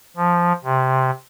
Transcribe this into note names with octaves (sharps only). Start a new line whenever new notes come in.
F3
C3